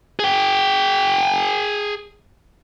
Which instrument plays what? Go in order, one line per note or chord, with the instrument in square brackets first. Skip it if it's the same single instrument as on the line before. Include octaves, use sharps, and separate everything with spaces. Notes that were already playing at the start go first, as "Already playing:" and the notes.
[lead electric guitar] G#4 G5